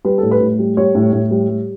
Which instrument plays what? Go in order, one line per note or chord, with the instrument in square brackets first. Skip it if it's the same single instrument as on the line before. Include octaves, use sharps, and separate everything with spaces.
[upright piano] G3 B4
A2 A4
B4
A2
G3
G3 C#5
A2
A2
G3
G3